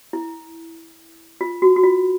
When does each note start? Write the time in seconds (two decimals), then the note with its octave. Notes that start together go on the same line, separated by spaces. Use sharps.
0.13 E4
1.41 F4
1.62 F#4
1.76 F#4
1.83 F4